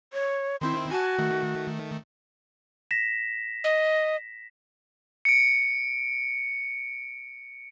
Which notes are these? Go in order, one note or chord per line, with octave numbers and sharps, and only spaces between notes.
C#5
D#3 C4 E4 C6
F#4 G#5 A5
D#3 A3
A#6 B6 E7
D#5
C#7 D7